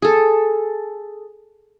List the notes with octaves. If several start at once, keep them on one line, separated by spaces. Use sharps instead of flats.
G#4 A4